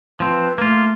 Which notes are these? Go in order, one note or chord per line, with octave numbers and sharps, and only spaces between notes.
F3 C4 B4
A3 A#3 F4